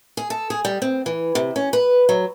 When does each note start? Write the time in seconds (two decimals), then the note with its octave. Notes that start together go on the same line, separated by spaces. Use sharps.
0.17 G#4
0.30 A4
0.50 G#4
0.65 G3
0.82 C4
1.06 E3
1.35 C3
1.56 C#4
1.73 B4
2.09 F#3